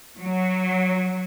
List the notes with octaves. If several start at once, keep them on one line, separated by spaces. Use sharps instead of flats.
F#3